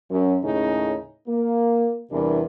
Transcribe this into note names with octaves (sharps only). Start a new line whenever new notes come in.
F#2
D#2 A2 C#3 C#4 D#4 G#4
A#3
E2 C3 E3 G3 D4 A#4